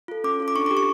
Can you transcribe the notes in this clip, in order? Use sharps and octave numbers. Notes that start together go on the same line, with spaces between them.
F4 A4
C#4 D6
F4 A4
D6
D4 C#6
D6
G4
C#6